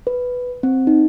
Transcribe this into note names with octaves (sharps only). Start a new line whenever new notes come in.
B4
C4
D#4